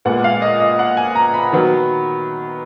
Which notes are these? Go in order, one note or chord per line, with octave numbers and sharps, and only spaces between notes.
A#2 G#3 B3 F#5
F5
D#5
D#5
F#5
G#5
A#5
B5
D#3 F#3 B3